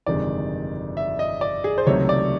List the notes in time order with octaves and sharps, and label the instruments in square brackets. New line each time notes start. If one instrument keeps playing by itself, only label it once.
[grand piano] G1 F2 C3 D#3 G#3 D5
E5
D#5
D5
G#4
C5
C#2 C3 D#3 F#3 A3 C#5
D5